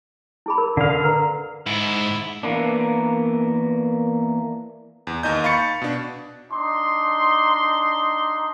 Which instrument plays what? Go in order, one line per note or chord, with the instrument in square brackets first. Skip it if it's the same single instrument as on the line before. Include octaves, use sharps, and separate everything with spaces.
[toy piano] E4 G#4 B5
A#4
[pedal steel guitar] D3 F5 [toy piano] A4 A#4 D5
[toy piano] A#4 B4 A#5
[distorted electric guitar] G#2 [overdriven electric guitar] E4
[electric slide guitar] E3 A#3 B3 D4
[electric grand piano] E2
D#2 D#4 D#5 G6
F5 B5 C#6 A6 C#7
B2 D4
[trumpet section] D4 D#4 C6